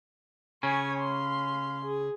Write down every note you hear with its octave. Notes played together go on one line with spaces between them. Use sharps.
C#3 C#4 C#5 G#5
F5 C6
G#4